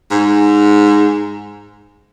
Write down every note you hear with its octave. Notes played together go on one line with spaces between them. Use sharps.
G#2